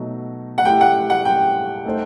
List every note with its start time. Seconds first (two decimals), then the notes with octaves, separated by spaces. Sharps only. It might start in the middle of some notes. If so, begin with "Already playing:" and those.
Already playing: B2 F#3 A3 D#4 F#4
0.58 F#5
0.65 A3 E4 G4 G5
0.81 F#5
1.10 F#5
1.25 G5
1.85 A3 D#4 A4 C5